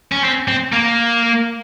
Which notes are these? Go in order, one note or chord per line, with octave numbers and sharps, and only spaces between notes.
C#4
C4
C4
A#3